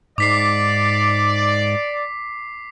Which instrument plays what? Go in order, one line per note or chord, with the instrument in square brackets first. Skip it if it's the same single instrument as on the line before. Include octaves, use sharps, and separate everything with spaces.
[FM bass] G#2 [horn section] D5 [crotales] D6 B6 C7